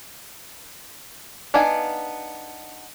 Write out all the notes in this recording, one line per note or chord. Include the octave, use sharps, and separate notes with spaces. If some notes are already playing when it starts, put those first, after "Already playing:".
B3 D4 D#4 F5 G#5